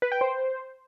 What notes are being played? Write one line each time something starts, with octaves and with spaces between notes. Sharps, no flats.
B4
G5
C5